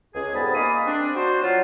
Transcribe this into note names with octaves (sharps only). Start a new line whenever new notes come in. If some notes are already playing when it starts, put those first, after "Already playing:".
C#2 G#4
F2 G#2 G3 B3 A5 B5
A#3 G#4 D#5 F5 B5 D#6
C4 D4
D4 F#4 C5
F#3 F4